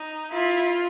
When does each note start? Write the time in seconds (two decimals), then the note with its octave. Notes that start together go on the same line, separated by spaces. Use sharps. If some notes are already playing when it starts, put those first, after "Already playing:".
Already playing: D#4
0.32 E4 F4